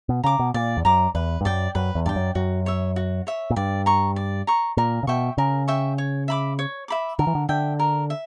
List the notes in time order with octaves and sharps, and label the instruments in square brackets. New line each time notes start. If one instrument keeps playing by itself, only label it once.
[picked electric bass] B2
[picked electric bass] C#3 [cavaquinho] A#5 D6
[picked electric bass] B2
[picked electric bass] A#2 [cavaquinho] D5
[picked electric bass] E2
[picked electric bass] F#2 [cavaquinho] A#5 D6
[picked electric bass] E2 [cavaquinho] B4
[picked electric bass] G2
[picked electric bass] F#2 [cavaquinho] D5 G5
[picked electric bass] F#2 [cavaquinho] B4
[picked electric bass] E2
[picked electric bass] G2 [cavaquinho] D5 G5
[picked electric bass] F#2
[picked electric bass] F#2 [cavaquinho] F#4
[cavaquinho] C#5 E5
F#4
C#5 E5
[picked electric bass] A#2
[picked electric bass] G2 [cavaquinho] D5
[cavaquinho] A#5 C#6
D5
A#5 C#6
[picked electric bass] A#2 [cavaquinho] A#4
[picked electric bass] C#3
[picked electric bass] B2 [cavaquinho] E5 G5 C#6
[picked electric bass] C#3 [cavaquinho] A#4
[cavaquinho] E5 G5 C#6
C#5
E5 B5 D6
C#5
E5 B5 D6
[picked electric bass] D3 [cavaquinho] A#4
[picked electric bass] E3
D3
[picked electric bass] D3 [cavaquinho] E5 G5
[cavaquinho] A#4
E5